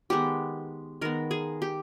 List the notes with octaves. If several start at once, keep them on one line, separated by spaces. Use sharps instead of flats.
D#3 G#3 B3 G4
D#3 G#3 B3 A#4
G#4
G4